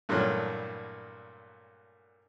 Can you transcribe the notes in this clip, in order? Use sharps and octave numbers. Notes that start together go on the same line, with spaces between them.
G2 A#2 E3 F#3 A3